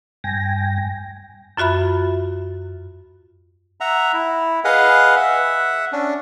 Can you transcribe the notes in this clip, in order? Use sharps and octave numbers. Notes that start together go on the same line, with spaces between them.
G2 G5 G#5 A#6
F#2 F4 F#4 E5 B5
E5 F#5 A#5
E4
G#4 B4 D#5 F5 F#5
E5 F#5
C#4 D4